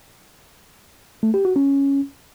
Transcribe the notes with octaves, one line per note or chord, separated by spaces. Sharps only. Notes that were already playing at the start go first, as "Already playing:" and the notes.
A3
G4
F#4
C#4